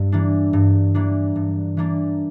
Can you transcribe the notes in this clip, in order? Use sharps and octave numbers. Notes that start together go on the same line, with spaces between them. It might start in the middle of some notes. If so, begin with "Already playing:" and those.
Already playing: G2
E3 A#3 D4
G2
E3 A#3 D4
G2
E3 A#3 D4